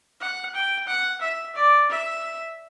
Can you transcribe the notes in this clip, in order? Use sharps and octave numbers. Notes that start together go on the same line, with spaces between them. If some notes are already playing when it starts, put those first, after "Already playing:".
F#5
G5
F#5
E5
D5
E5